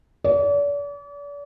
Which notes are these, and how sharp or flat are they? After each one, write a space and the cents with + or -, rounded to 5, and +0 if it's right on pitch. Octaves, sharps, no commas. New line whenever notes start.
D5 -40